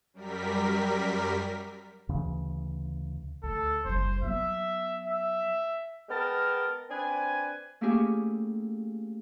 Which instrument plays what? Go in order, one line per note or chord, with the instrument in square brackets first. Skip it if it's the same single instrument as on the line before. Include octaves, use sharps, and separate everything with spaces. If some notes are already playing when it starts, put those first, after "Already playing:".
[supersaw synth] F#2 G3 A#4 B6
[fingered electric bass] D2 C#3 E3
[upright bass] D2 [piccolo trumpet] A4
[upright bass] F#1 G3 [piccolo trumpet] C5
[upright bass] F#3 B3 [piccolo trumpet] E5
[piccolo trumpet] E5
[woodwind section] G#3 B3 A#4 G5 A5 F6
C4 D4 B4 G#5
[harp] A3 A#3 C#4 E4 G4 G#4